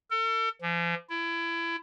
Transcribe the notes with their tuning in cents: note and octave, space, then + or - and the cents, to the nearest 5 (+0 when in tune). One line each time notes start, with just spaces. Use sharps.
A4 +40
F3 -40
E4 +25